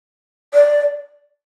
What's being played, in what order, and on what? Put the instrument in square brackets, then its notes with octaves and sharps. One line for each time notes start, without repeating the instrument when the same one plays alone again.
[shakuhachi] D5